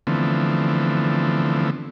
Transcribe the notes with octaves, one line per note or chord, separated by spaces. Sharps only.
D3 E3 F3 A3 B3 C4